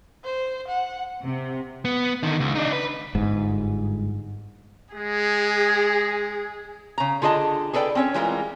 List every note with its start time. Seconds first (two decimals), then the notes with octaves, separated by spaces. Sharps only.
0.24 C5
0.68 F#5
1.25 C3
1.85 B3
2.23 D3 D#3
2.40 C#2
2.55 D4 D#4
2.73 B4
3.15 G1 G#2
4.94 G#3 G#4
6.98 C#3 A#5
7.22 D3 F4 G#4 D#5 A5
7.73 G#4 A4 B4 D5 G5
7.95 C4 C#4 C#5
8.14 E3 G3 G#3 D4 F4 A#4